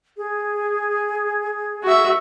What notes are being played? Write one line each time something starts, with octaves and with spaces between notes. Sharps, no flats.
G#4
F#4 E5